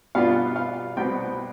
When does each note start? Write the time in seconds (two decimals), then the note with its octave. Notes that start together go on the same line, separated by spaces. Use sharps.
0.15 B2 G3 B3 D4 F4 F5
0.56 F5
0.96 C2 B2 B3 G5